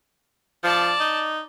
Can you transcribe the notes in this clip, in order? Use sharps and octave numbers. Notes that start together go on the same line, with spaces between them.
F3 D5 A5
D#4